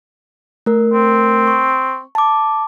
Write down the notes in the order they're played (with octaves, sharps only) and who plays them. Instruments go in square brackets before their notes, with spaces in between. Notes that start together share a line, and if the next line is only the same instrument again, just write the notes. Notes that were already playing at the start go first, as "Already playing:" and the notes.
[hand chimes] A3 A#4
[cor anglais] C4
[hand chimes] C#6
A5 D6